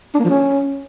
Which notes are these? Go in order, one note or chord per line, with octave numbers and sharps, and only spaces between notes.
D4
A#3
F3
C#4